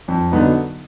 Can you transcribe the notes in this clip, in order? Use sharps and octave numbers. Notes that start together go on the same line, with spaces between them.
F2
D3 F#3 B3 D#4